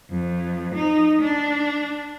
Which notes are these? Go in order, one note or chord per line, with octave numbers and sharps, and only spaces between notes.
F2
D#4
D4